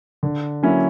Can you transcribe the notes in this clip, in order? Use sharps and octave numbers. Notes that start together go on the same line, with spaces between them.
D3
F#3 A#3 C#4 E4